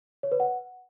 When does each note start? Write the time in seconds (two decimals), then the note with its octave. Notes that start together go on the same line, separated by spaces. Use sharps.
0.23 C#5
0.32 B4
0.40 F#5